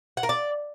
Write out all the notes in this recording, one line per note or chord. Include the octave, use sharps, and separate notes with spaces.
F#5
A#4
D5